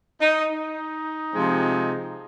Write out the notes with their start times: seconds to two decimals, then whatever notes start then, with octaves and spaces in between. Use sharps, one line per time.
0.21 D#4
0.49 D#4
1.33 C3 F3 G#3 C4